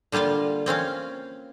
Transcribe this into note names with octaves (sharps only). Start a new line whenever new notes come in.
D3 G3 A#3 F4 F5
A#3 C4 C#4 F5